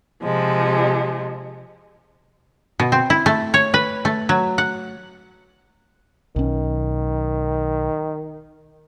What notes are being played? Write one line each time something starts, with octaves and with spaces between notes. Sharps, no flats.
C3 F3 G#3
B2
C4
E4
A3
C#5
B4
A3
F#3
F#5
B1 D#3 C#4